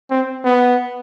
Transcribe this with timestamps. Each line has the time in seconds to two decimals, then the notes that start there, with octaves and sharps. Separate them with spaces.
0.10 C4
0.45 B3